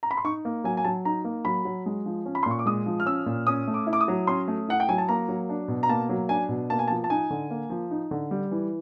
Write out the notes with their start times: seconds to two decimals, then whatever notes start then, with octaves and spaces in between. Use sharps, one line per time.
0.03 A#5
0.11 B5
0.17 C6
0.24 D#4 C#6
0.45 A#3
0.64 F#3 G#5
0.77 G#5
0.84 F#3 A5
1.05 D#4 A#5
1.25 A#3
1.45 F#3 B5
1.65 F#3
1.86 G#3
2.06 F3
2.26 C#4
2.35 B5
2.43 C6
2.46 A#2 C#6
2.59 D6
2.66 G#3 D#6
2.86 F3
3.00 F6
3.06 C#4 E6
3.26 A#2
3.47 C#4 D#6
3.67 A3
3.74 D6
3.87 E4
3.93 D6
4.01 D#6
4.08 F#3
4.27 C#4 C6
4.48 A3
4.68 E4 F#5
4.80 G5
4.89 F#3 G#5
4.98 A5
5.09 A#3 A#5
5.29 F#3
5.49 D4
5.68 B2
5.83 A#5
5.89 A#3 A5
6.09 F#3
6.29 D4 G#5
6.49 B2
6.70 A#3 A5
6.79 G#5
6.88 A5
6.90 F3
7.04 A5
7.10 D#4 G#5
7.30 D3
7.51 A#3
7.70 F3
7.91 D#4
8.11 D3
8.31 G3
8.51 E3